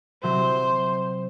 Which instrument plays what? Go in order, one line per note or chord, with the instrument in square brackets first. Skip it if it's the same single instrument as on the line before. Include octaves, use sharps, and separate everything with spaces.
[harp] C3 F#3 [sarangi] C5